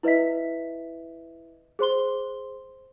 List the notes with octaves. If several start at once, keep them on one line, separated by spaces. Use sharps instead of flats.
E4 B4 D#5 E5 B6
G#4 C5 C6 G7